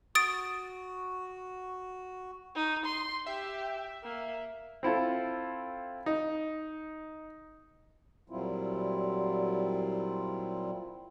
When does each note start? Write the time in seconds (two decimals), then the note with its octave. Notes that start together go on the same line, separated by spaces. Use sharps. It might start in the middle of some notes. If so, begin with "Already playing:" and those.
0.15 F#4 D#6 A6 D7
2.56 D#4
2.85 C6
3.26 G4 E5
4.03 A#3
4.83 C4 E4 F4 A4
6.06 D#4
8.30 A#2 F#3 G3 C4 E4 F4